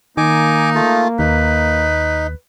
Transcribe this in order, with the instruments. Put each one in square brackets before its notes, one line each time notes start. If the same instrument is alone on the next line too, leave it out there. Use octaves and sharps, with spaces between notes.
[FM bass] D#3 [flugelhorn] A#3 [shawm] D#4 [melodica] G#5 D6
[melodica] A3 F4
[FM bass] D#2 [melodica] D#4 [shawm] B4